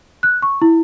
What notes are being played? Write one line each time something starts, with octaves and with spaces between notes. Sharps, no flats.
F#6
C#6
E4